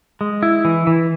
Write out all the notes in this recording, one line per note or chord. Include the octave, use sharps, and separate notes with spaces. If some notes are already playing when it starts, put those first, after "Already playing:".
G#3
E4
E3
E3